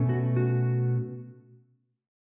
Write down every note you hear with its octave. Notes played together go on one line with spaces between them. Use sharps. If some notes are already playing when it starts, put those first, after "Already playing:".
Already playing: B2 A3 C#4
F#4
F#4